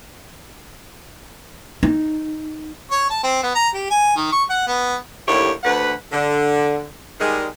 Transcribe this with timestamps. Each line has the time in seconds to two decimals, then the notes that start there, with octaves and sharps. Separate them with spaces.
1.83 D#4
2.91 C#5
3.10 A5
3.23 C4
3.43 B3
3.55 A#5
3.74 G4
3.90 G#5
4.16 D#3
4.32 C#6
4.50 F#5
4.67 B3
5.28 D#2 A2 D3 E4 G4 C#5
5.63 D2 B4 F#5
6.11 D3
7.19 D#3 G3 G#3